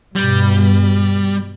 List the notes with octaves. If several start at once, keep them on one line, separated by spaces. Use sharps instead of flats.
G2 B2 G3